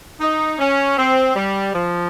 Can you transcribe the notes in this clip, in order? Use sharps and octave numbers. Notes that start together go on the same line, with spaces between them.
D#4
C#4
C4
G3
F3